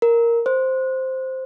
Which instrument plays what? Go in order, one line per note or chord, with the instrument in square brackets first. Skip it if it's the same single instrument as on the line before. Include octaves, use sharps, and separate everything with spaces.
[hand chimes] A#4
C5